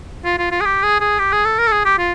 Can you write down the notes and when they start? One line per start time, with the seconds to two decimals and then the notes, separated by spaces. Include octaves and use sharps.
0.25 F4
0.38 F4
0.51 F4
0.61 G#4
0.65 G4
0.83 G#4
1.00 G#4
1.19 G4
1.32 G#4
1.45 A4
1.59 A#4
1.67 A4
1.72 G#4
1.85 G4
1.99 F4